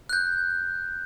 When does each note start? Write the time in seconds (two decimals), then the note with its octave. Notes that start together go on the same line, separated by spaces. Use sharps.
0.09 F#6 G6